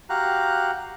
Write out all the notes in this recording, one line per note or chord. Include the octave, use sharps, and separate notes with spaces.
F#4 G4 F5 A#5 F#6